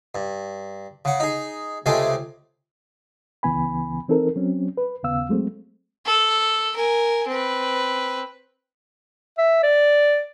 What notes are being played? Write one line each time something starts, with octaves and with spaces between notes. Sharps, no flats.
G2
C#3 F#5
D#4 G#4
C#2 C3 G#3 A3 G5 G#5
C#2 C#3 E3 B3 G#5 B5
E3 C4 D#4 A4 A#4
F#3 C4 C#4
B4
D#2 C#3 B3 F5 E6
F#3 G#3 A3 C4
A4
A#4 G#5
C4 B4
E5
D5